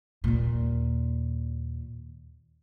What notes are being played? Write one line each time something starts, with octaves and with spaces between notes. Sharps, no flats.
D#2 A#2